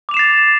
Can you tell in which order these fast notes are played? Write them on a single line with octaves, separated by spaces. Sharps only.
D6 F7 E7 C7 A6